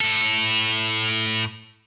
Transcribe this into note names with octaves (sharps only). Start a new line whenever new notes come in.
A2 A4